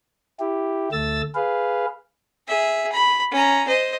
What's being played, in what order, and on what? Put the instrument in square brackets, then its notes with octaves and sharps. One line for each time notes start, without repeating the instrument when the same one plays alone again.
[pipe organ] E4 G4
D2 A3 E6 A6
G#4 B4 F5
[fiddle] G#4 E5
B5
C#4 A#5
C5 D#5